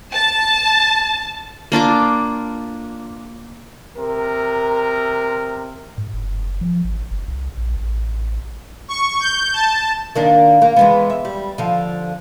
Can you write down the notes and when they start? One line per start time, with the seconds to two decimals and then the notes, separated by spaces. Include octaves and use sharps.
0.13 A5
1.72 A#3 D4 F4 D6
3.97 C3 A#4
5.98 G#2
6.13 F#1
6.61 F3
6.84 G#1
7.11 F#1
7.28 C2
7.57 A#1
7.77 A1
8.88 C#6
9.20 G6
9.53 A5
10.16 D#3 A#3 D4
10.62 A#3
10.76 E3 G#3 B3
11.10 E5
11.25 G3
11.58 D3 F3